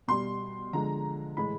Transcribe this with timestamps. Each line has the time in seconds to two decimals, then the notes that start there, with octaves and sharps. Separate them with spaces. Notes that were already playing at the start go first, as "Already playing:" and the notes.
0.08 B2 G3 C6
0.73 D3 F3 G#3 A#5
1.37 A2 E3 G#3 B5